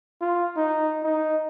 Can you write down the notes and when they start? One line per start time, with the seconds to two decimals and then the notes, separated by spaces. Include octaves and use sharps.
0.21 F4
0.57 D#4
1.03 D#4